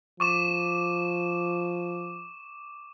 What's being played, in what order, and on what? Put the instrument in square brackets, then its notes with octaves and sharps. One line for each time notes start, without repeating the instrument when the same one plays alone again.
[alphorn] F3 [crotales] C#6 D6 E7